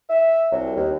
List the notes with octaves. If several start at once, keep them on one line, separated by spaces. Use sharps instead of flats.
E5
C2 F#3
D#2